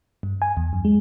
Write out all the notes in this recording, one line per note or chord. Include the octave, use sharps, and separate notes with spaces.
G2
G#5
E2
F#2
G#3